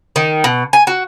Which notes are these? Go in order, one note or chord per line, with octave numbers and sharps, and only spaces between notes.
D#3
B2
G#5
F#4